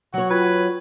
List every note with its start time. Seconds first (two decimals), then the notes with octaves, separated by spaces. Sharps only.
0.14 F#3 F#4 C#5
0.30 F4 B4 G5 G#6